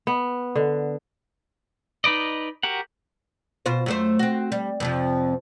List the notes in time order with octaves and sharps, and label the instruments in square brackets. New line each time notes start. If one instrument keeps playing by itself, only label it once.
[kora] B3
D3
[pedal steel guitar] D#4 B4 D5 D#5
F#4 G4 A#4 F#5
[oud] B2 F4 C5
F#2 A3 C5
C4 F#4
G3
F2 C3 F3